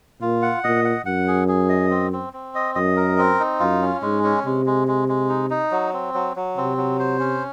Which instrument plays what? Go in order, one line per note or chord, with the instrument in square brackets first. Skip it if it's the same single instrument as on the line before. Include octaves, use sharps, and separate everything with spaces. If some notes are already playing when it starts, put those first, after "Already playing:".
[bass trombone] A#2 [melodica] F4
[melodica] F#5
[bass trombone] A#2 [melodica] D#5
[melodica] F#5
[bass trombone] F#2 [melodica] F#5
[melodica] G#4
G#4
D#5
C4
C4
C4
D#5
[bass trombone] F#2 [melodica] D#5
[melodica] A#4
C4
D#4
[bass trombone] F#2 [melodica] F4
[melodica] C#4
[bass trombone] G#2 [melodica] G#3
[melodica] C#4
[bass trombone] C3 [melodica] G#3
[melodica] G#3
G#3
G#3
D#4
D#4
F#3
C4
F#3
F#3
[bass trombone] C3 [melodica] C4
[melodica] F#3
C5
C#4